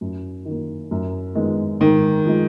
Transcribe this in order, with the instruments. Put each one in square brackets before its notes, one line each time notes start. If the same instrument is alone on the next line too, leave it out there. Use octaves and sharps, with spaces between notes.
[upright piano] F#2
D#3
A#3
F#2
D#3 G#3 B3
[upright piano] G#2 [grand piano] D#3
[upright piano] F3 G#3